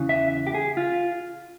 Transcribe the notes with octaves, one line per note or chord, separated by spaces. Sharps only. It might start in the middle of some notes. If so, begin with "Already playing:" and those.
Already playing: E2 C#3 E3
E5
G4
G#4
F4